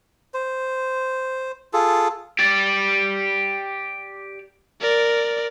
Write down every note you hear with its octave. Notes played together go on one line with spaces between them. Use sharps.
C5
F4 G#4 A4
G4 D5
A#4 D5